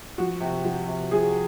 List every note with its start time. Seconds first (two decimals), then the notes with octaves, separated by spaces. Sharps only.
0.18 F3 F#4
0.41 C3
0.64 F3
0.88 C3
1.11 F3 G#4